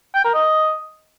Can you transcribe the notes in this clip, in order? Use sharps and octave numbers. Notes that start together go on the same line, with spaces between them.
G5
A#4
D#5